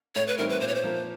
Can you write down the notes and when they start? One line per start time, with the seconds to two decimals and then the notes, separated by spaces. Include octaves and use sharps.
0.15 A2 C#5
0.27 B4
0.38 E3 G3 C4 D#4 A#4
0.49 B4
0.60 A#2 C5
0.68 C#5
0.75 C5
0.84 F3 A#3